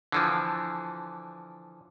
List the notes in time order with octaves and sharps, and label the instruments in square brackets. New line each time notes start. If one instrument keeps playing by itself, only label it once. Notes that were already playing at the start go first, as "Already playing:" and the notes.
[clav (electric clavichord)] D3 E3 F3